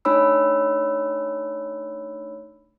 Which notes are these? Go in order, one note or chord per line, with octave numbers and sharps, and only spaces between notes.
A3 D4 D#4 C#5 B5 E6